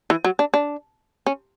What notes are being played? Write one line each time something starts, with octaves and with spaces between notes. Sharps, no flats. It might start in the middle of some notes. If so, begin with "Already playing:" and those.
E3
F#3
D4
D4
C#4